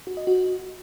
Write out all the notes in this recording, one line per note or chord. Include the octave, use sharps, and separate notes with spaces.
F#4
D#5
F#4